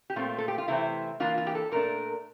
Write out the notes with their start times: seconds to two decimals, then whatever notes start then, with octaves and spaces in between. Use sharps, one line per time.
0.10 G4
0.16 A#2 A3 C4 F4
0.38 A4
0.48 G4
0.58 F4
0.68 C3 E3 A3 C4 E4
1.20 E3 A#3 D4 F4
1.38 F4
1.47 G4
1.55 A4
1.72 A#2 A3 D4 A#4